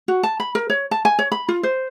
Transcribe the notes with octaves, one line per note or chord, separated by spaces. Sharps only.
F#4
A5
B5
A#4
C#5
A5
G#5
C#5
B5
F4
C5